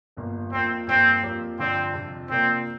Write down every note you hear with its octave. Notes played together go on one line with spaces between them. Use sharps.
G1 G2 F3 A#3
F2 F3 A#3 C4
G2 F3 A#3 C4 F4
F2 F3 A#3 G4 C5
G2 D3 F3 C4 D4
F2 C3 F3
C3 F3 A#3 C4 D4